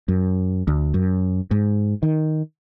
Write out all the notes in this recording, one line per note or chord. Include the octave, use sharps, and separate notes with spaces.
F#2
D2
F#2
G#2
D#3